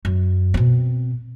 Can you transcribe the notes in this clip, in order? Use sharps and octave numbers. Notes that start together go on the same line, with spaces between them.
F#2
B2 C4